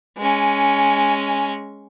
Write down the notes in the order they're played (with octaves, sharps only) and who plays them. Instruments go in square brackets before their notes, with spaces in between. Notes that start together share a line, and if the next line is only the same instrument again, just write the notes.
[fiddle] G#3 C#4